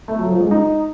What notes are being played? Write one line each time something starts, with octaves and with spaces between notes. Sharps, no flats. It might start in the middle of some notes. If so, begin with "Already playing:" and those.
A3
F#3
F3
G#3
D#4